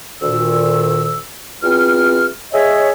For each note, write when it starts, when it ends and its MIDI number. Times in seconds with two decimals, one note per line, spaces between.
0.22 1.19 38
0.22 1.19 46
0.22 1.19 51
0.22 1.19 88
1.63 2.27 40
1.63 2.27 60
1.63 2.27 65
1.63 2.27 89
2.53 2.90 68
2.53 2.90 73
2.53 2.90 75
2.53 2.90 76